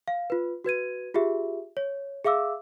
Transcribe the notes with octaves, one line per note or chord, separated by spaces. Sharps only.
F5
F4 B4
F#4 B4 G#6 D#7
F4 G4 G#4 E5
C#5
G#4 E5 F5 D6 E6